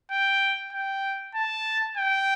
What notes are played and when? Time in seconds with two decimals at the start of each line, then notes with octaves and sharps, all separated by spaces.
0.11 G5
0.73 G5
1.35 A5
1.97 G5